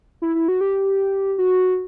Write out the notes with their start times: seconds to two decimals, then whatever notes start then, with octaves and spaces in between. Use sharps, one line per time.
0.22 E4
0.35 E4
0.48 F#4
0.61 G4
1.38 F#4